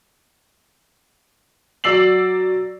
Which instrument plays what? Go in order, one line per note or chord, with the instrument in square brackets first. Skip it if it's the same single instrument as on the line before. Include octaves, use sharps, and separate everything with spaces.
[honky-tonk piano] F#3 D5 E6 C7 F#7